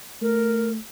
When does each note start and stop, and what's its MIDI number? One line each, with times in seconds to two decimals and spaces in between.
0.22 0.77 57
0.22 0.70 70